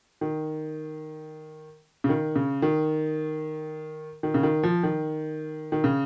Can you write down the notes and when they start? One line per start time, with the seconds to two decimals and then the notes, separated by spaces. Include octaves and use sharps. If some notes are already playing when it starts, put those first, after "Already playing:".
0.21 D#3
2.04 C#3
2.09 D#3
2.36 C#3
2.62 D#3
4.23 D#3
4.34 C#3
4.43 D#3
4.63 F3
4.83 D#3
5.72 D#3
5.84 C#3